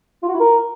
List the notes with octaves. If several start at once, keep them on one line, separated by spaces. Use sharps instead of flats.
F4
F#4
E4
A#4